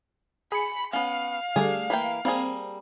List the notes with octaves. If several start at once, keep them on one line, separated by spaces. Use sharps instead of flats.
G#4 B5 C#7
B3 C#4 F5
D3 G3 A3 D4 G#4
E3 A#3 G5
G3 A#3 C4 G#4